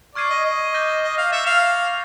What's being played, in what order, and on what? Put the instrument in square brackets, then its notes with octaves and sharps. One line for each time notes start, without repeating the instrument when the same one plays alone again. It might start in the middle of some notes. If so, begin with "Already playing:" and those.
[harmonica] D5 [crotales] C#6 F6 G#6 C7 D#7
[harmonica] D#5
D#5
[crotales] D6 G6 A#6 D#7 G7
[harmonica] D#5
F5
[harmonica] E5 [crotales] A6 C#7 F7
[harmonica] F5